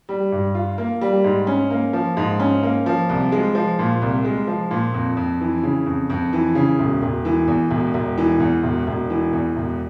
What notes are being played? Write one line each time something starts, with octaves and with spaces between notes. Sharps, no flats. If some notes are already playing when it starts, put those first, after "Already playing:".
G3
G2
F4
A#3
G3
G#2
C#4
A#3
F3
G#2
C#4
A#3
F3
C2
G#3
F3
A#2
C2
G#3
F3
A#2
F2
F2
E3
C#3
F2
F2
E3
C#3
E1
E1
E3
E2
E1
E1
E3
E2
E1
E1
E3
E2
E1